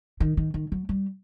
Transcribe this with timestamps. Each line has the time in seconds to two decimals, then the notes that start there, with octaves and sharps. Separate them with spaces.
0.20 D#3
0.37 D#3
0.54 D#3
0.72 F#3
0.89 G3